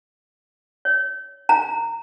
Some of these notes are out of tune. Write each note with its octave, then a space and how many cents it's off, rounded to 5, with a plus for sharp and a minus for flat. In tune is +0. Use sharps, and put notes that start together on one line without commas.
C#5 +15
A#5 -20